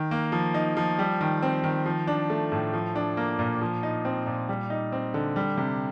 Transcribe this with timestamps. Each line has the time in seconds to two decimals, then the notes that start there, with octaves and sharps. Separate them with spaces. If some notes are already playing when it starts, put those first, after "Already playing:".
Already playing: D#3
0.11 A#3
0.32 F3
0.54 D#4
0.77 F3
0.99 G3
1.21 D#3
1.42 C4
1.64 D#3
1.86 F3
2.07 D4
2.30 A3
2.52 A2
2.73 F3
2.96 D4
3.17 A#3
3.39 A#2
3.61 F3
3.83 D#4
4.05 C4
4.27 A#2
4.49 G3
4.70 D#4
4.92 C4
5.14 D3
5.36 G3
5.57 C3